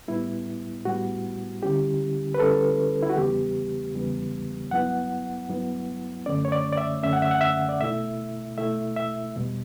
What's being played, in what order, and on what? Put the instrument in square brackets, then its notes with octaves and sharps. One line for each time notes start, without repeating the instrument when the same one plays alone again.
[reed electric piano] A2 G3 B3 E4
A2 G3 B3 F#4
D3 G3 C#4 E4 G4
B4
D3 G3 C#4 E4 A4
E4
F#4
E2 C#3 E3 G3 B3 G4
E2 C#3 E3 G3 B3
G2 F#3 B3 E4 F#5
G2 F#3 B3 E4
F#2 D3 A3 C#4 D5
C#5
D5
D5
E5
F#2 D3 A3 C#4 E5
F#5
E5
F#5
E5
D5
B2 A3 E4 E5
B2 A3 E4 E5
E5
E2 B2 G3